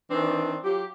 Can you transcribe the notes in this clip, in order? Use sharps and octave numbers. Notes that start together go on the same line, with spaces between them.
D#3 E3 C4 D4
F#3 F4 G4